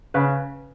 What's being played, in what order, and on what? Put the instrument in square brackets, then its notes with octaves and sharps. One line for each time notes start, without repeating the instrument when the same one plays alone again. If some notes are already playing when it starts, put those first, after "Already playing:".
[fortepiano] C#3 B4